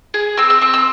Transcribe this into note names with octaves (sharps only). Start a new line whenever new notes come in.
G#4
C4 E6
E6
C4 E6
E6